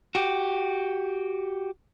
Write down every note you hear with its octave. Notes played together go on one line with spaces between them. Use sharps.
F#4 G4